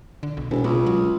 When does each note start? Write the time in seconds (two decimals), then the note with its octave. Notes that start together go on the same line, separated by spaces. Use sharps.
0.23 D3
0.37 B1
0.51 E1 B2
0.64 C#2 B2
0.86 F#3